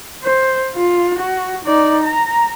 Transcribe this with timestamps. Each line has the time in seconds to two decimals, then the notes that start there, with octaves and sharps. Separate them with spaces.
0.24 C5
0.76 F4
1.19 F#4
1.64 D#4 D5
2.03 A#5